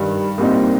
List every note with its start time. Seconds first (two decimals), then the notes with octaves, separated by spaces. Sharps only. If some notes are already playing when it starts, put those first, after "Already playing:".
Already playing: G2 D#3 G3
0.38 C2 A#2 G3 C4 D#4